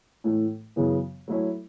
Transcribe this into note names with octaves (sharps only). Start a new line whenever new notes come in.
A2 E3 A3
F#2 C#3 E3 B3
F#3 A3 E4 C#5